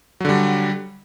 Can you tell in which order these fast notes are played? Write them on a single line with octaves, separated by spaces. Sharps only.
F#3 D3 G3